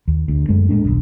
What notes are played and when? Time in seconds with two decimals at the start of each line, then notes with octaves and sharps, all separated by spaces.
0.08 D#2
0.28 D2
0.49 F#2 G#3 A3
0.69 A2 G#3 A3 D4
0.84 D#1 B1